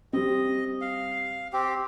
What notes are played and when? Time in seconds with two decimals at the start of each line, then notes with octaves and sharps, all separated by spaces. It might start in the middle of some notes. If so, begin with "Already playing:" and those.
0.13 G3 C4 D#5
0.81 F5
1.53 C4 G4